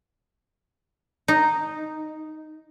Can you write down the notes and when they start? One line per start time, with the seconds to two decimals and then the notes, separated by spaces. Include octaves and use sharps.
1.28 D#4